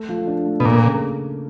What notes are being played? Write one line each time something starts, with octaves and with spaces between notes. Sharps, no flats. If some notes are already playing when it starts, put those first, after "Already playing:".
Already playing: A3
F3
D4
A3
B2
A#2 A#3
C#3